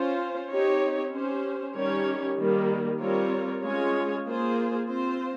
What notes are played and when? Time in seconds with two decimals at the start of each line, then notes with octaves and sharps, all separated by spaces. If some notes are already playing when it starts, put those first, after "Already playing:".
Already playing: C#4 F4 C5
0.50 C4 D#4 G4 C#5
1.13 C#4 G4 C5
1.75 D#3 G3 C#4 G4 C#5
2.38 D#3 G3 A#3
3.01 G3 C4 F4 A#4 C#5
3.62 G#3 C#4 F4 G#4 C#5
4.25 A#3 F4 G#4 C5
4.88 C4 F4 C5